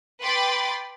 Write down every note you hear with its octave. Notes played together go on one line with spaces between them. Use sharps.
B4 G5 B5 C6 D6 A6